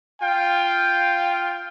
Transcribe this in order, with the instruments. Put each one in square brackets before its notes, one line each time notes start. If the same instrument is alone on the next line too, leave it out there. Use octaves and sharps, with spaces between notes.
[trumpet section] F4 F5 G5